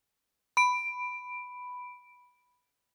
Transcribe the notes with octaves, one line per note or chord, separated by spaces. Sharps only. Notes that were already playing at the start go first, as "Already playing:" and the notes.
B5 D7